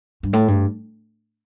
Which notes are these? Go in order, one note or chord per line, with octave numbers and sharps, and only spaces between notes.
G2
A2
G2